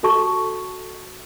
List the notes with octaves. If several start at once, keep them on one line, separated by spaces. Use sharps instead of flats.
F#4 A4 A5 C#6